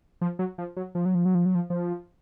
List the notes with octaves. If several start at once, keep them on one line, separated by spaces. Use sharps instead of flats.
F3
F#3
F3
F#3
F3
F#3
F3
F#3
F3
F#3
F3
F3